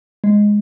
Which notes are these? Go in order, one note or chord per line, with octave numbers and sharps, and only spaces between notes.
G#3